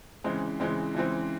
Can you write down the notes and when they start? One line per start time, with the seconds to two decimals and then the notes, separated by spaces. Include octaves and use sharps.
0.24 C#3 E3 G#3 C4
0.60 C#3 E3 G#3 C4
0.95 C#3 E3 G#3 C4